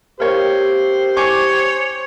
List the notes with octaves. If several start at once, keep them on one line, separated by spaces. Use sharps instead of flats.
A#3 G4 C5 C#5
C#5 G#5 C#6 D6